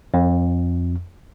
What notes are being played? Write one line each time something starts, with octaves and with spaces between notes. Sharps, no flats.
F2